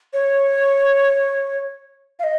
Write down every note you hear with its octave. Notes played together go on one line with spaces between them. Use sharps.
C#5
F5
D#5